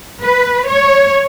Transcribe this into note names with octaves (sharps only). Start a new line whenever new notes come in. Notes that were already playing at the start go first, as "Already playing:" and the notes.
B4
C#5